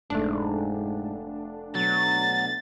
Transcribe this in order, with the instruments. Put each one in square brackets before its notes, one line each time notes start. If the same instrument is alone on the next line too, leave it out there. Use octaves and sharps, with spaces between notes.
[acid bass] F1 [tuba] G#2 [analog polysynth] A3 D4
[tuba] B2 [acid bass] F#3 [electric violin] A6